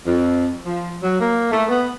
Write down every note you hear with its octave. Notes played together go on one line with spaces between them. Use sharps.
F2
F3
F#3
A#3
A3
B3